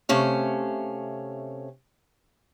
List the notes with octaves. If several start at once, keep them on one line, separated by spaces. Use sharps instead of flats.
C3 A3 C#4 F5